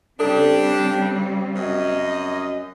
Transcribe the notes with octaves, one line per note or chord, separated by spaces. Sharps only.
C#3 G3 C4 D4 G4 A4
F#2 D#5